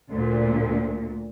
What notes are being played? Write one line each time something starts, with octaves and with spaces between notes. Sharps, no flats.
D2 A#2